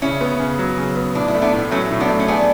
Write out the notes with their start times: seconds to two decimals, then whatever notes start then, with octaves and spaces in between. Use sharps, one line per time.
0.02 C#3 C#4 E4
0.21 B3
0.40 C#3
0.59 F#3
0.78 C#3
0.96 B3
1.15 A2 D4
1.28 E4
1.35 A3
1.42 B3 D4
1.53 A2
1.71 F#3 A3 C#4
1.91 A2
2.00 B3 D4
2.09 A3
2.20 C#4
2.28 B3 D4 G#4